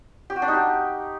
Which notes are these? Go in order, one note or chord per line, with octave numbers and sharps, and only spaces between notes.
G4
F#4
D4
D#4
G4